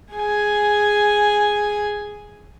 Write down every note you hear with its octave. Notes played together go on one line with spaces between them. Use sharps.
G#4 G#5